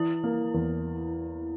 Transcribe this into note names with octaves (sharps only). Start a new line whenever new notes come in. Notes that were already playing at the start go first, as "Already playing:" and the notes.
Already playing: E3 E4
A#3
E2